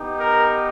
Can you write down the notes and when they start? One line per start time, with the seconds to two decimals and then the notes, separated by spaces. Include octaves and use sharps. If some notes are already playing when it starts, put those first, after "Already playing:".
Already playing: B3 D#4 G4
0.19 A#4